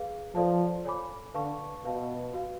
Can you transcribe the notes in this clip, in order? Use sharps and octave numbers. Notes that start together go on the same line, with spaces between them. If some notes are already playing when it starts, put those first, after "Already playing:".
Already playing: G#4 B4 F5
F3 A4 D5 F5 A5
A4 C#5 G#5 B5 D6
D3 B4 F5 A5 C#6
B2 B4 F5 A5
F#4 B4 F5